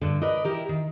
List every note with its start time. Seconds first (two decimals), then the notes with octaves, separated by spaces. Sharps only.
0.01 G2 D3
0.22 A#4 B4 D5 D#5
0.45 E4 G4 A#4
0.69 D#3